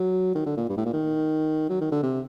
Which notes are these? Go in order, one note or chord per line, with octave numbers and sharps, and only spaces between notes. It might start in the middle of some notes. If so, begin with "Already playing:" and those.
Already playing: F#3
D#3
D3
A#2
G2
A2
A#2
D#3
F#3
D#3
D3
C3